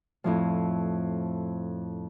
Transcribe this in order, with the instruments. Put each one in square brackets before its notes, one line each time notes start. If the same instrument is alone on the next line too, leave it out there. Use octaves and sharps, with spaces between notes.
[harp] F2 A2 F3